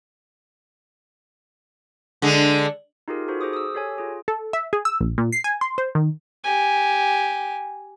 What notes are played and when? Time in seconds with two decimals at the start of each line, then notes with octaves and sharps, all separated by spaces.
2.22 D3 G#3
3.08 D#4 F4 G4 G#4 A#4
3.28 D#4 F#4 A4 C5
3.41 G#4 C5 D6 D#6
3.53 D#6 E6
3.74 G4 A4 C#5 G#5
3.98 F4 G#4
4.28 A4
4.53 E5
4.73 G#4
4.85 E6
5.00 A#1
5.18 A#2
5.32 C7
5.44 G#5
5.61 C6
5.78 C5
5.95 D#3
6.44 G4 G#5